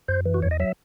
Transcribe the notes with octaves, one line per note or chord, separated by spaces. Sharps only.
F#2 C5
E3
F#4
E2 C#5
D#5
F#3 E5